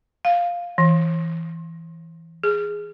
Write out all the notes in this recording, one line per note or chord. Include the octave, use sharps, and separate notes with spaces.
F5
E3
G#4